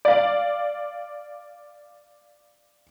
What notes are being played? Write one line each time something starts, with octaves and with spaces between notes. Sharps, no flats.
D5 F5